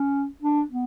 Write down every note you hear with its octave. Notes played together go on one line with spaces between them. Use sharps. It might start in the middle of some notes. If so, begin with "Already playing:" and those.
Already playing: C#4
D4
B3